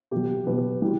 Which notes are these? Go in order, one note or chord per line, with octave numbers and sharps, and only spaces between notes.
B2 F#3 G4
B2 F#3 B4
E3 G3